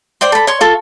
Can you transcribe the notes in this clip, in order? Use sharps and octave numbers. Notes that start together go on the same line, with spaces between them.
C5 D5 G5 C6
A4 B5
C#5 C6 C#6
F4 A4 C#6